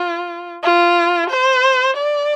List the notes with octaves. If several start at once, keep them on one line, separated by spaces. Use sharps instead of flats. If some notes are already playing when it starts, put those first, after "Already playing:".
Already playing: F4
F4
C5
D5